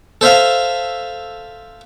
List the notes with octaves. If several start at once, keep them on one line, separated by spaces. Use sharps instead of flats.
A4 C5 E5 F5